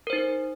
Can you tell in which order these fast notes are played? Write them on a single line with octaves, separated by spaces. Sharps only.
A#4 C5 D#4